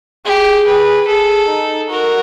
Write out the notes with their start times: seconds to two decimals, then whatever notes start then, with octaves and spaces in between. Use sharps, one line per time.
0.25 G4 G#4
0.66 B4
1.07 G#4 A4
1.48 D#4
1.90 F#4 A#4